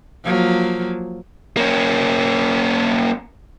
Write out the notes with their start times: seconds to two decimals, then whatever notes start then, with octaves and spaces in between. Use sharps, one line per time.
0.24 F3 F#3 A#3
1.57 A#3 C#4